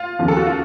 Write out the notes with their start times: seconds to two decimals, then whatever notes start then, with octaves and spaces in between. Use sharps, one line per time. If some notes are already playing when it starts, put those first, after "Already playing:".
Already playing: F4
0.19 D#2 C#3 F3
0.28 A4
0.37 F#4
0.47 F4